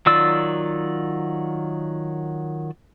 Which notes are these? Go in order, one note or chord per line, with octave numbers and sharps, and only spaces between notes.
D#3 F#3 F4 D5 E6